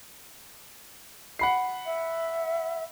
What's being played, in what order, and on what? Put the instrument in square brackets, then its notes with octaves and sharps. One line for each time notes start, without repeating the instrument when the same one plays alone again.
[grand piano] F#5 B5 C7
[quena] E5